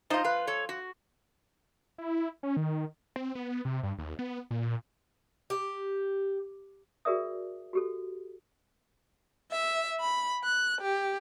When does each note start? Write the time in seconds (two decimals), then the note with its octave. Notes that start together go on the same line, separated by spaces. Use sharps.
0.10 F3 D#4 F4 C5 D#5
0.24 B4 F5
0.47 A4 C#5
0.69 F#4
1.98 E4
2.43 C#4
2.57 D#3
3.16 C4
3.35 B3
3.65 C3
3.83 G2
3.99 D#2
4.19 B3
4.51 A#2
5.50 G4
7.05 F#4 G#4 A#4 D5 E5 D#6
7.73 F#4 G4 A4
9.51 E5
10.01 B5
10.44 F#6
10.81 G4